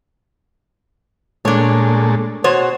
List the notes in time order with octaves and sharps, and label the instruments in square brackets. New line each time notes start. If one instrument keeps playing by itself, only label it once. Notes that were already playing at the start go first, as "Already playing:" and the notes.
[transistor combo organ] A#2 G#3 A3 [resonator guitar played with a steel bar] D4 C#5
[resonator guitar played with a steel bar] B2 C5 C#5 [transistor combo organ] F#4